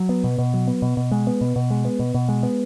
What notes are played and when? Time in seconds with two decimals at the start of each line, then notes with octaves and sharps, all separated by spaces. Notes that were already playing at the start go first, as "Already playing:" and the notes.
Already playing: F#3
0.09 B3
0.24 B2
0.38 B2
0.54 F#3
0.68 B3
0.82 B2
0.97 B2
1.12 G#3
1.27 B3
1.41 B2
1.56 B2
1.71 G#3
1.85 B3
2.00 B2
2.14 B2
2.29 G#3
2.43 B3